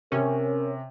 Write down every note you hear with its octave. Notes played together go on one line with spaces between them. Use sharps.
C3 C#4 A#4